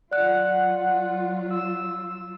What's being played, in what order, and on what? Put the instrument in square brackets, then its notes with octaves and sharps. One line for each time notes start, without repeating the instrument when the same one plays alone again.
[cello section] F#3 F4 [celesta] D5 F#6 [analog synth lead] F#5
[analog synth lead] E6